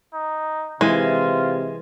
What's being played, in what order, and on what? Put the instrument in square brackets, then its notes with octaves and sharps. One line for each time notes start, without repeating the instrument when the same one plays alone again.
[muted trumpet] D#4
[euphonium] C3 [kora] E3 [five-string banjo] G#3 [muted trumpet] F4